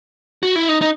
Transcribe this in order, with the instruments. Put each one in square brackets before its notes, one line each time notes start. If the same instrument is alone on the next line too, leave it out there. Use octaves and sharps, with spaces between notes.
[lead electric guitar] F#4
E4
D#4
D#4